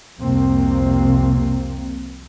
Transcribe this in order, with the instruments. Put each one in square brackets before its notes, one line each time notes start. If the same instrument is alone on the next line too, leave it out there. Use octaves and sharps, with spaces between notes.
[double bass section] C2 F2 C3 A#3 C4